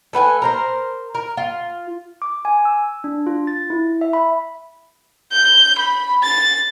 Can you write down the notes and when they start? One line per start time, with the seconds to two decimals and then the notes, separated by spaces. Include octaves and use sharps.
0.13 A3 B4 F#5 G#5
0.42 A#4 C5 A#5
1.15 A#4
1.37 F4
2.22 D6
2.45 G#5
2.65 E6
3.04 D4
3.27 F4
3.47 A6
3.70 E4
4.01 E5
4.13 B5
5.32 G6
5.78 B5
6.24 A6